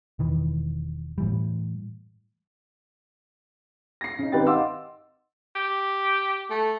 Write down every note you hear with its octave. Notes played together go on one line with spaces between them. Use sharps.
E1 D#3 E3
A2 E3 G3
A#6 C7
C#3 D#4
G#1 D#4 G4 B4 G5 A6
D#5 F5 F#5 C6 D6 E6
G4
A3